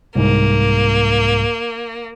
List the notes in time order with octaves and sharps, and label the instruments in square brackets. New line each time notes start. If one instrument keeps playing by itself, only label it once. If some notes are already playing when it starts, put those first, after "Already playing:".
[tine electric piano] C2 G#2 [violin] A#3